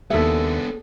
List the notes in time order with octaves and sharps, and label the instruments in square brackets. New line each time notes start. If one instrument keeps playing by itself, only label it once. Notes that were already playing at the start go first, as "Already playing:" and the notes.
[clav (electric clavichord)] D#2 E5 [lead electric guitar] B3 D4 [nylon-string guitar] G#4 A4